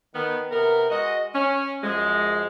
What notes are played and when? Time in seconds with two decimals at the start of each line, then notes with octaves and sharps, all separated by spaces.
0.14 D#3 B3
0.51 C3 B3 A#4
0.89 G#3 F#4 D#5
1.34 C#4
1.83 F#2 F3 G#3